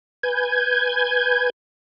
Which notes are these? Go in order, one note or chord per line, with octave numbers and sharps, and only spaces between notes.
B4 G#5 G6 G#6